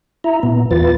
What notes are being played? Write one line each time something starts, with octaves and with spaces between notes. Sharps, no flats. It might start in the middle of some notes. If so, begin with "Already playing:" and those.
E4 E5 A#5
A#2 B3
E2 E3 F4 B4 A6